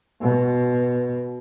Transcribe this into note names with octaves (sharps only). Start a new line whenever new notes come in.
B2